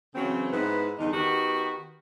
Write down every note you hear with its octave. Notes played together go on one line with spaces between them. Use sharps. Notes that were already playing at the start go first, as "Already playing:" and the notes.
C#3 E3 F#3 C4
G#2 B3 E4 B4 C5
E2 G2 D3 D#4
D#3 B3 F#4 G4